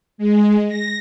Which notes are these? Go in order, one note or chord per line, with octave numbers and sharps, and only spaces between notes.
G#3
A#6